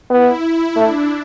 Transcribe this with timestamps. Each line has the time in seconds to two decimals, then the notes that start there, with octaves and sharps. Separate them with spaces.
0.10 B3 E4
0.76 A3 D4